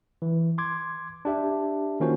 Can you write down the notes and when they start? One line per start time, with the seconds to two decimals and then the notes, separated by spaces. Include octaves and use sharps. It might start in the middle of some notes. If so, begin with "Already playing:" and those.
0.22 E3
0.58 C6 D6 G#6
1.25 D4 G4 E5
2.00 D#3 A#3 C#4 F4 F#4 C5